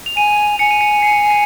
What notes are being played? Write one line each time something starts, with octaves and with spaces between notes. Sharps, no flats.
F7
G#5 D#7
G#5 C#7
D#7
C#7
C7
C7